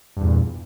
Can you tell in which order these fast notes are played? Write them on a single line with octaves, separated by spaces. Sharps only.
G2 E2 A#2